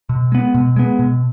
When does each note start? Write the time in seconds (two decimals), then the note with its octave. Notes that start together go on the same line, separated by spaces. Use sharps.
0.09 B2
0.32 G#3 B3
0.54 B2
0.76 G#3 B3
0.99 B2